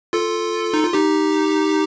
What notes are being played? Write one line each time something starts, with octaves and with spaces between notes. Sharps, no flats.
F4 A4
D#4
F4
D#4 G4